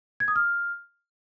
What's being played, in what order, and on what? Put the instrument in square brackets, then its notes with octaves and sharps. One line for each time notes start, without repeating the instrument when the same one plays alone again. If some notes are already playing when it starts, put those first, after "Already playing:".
[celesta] G#6
D#6
F6